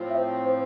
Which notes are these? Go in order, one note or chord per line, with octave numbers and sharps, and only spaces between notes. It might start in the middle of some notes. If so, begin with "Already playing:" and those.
Already playing: A2 F3 C4
E5
C5
C5